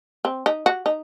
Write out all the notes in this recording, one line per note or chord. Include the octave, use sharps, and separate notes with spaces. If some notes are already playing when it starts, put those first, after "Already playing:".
C4
D#4
F#4
D#4